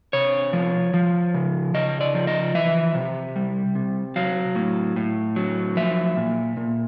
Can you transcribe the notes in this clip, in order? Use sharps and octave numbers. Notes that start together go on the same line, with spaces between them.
C3 C#5
F3
F3
C#3
C#3 D#5
D5
F3
D#5
E3 E5
C3
G3
C3
F#3 F5
A2
A2
F#3
F3 E5
A#2
A#2